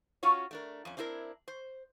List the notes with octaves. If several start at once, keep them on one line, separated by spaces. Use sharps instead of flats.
C#4 F4 F#4 C#5
A3 D4 A#4
F2 C#4
C4 D4 E4 G#4 A#4
C5